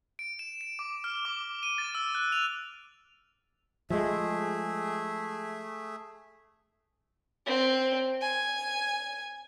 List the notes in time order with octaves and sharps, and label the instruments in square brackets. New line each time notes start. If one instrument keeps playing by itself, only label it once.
[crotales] D7
E7
D7
D6
F6
D6
D#7
A6
E6
F#6
F7
[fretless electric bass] F3 G#3 [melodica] A3 G#4 E5
[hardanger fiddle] C4
G#5